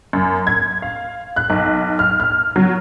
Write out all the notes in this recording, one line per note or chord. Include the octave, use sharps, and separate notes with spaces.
F#2
G#6
F5
F#6
B1
F6
F6
F#3